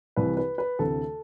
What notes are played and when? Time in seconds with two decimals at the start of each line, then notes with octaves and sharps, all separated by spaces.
0.16 C2 C3 E3 B4
0.37 B4
0.58 B4
0.79 D2 C3 E3 A4